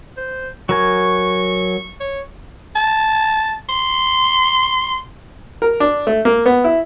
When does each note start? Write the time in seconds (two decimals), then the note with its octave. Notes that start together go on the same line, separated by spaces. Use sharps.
0.17 C5
0.69 F#3 A#4 G#5 C#6
2.00 C#5
2.75 A5
3.69 C6
5.62 A#4
5.80 D4
6.07 A3
6.25 A#3
6.46 B3
6.64 E4